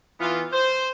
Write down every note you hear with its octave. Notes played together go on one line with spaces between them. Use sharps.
E3 B3 F4
C5